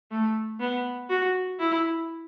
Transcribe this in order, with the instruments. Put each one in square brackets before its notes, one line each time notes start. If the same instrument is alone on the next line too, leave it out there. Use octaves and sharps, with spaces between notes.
[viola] A3
B3
F#4
E4